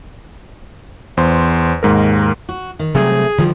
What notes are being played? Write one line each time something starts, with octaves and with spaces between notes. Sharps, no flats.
E2 C5 C6
D#2 G#2 A#4
F#4
D#3
C3 F#3 G3 A3 C4 G#4
D3 D#3 F3 G3